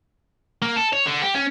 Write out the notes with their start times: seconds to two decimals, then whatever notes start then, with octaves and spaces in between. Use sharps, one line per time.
0.62 A#3
0.76 A4
0.93 C#5
1.06 D3
1.22 G4
1.35 C#4